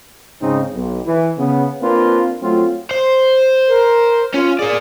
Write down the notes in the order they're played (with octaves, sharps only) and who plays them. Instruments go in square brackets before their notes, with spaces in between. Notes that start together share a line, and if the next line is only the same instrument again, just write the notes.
[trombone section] G#2 C#3 G#3 C4 D#4
B1
E3
C#3 B3
A#3 C4 D4 F4 B4
F#3 A3 C4 F4
[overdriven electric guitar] C5
[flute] A#4
[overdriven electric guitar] C#4 [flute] F4
[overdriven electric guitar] A#3 D5 [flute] G#4